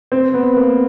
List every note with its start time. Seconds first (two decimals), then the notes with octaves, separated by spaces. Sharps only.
0.12 C4
0.34 B3
0.57 A#3